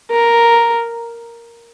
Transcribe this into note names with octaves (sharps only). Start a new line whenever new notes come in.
A#4